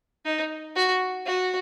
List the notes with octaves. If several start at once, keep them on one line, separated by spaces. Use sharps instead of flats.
D#4
F#4
F#4